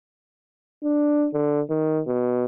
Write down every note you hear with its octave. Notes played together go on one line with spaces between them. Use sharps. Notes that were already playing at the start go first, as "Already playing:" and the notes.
D4
D3
D#3
B2